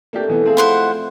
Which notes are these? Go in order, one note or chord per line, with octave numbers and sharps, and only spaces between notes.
C3 A3 A#3 D4 G4 A4
B2 E3 B3
F3 A3 C4 G#4
E4 C5 D5 F#5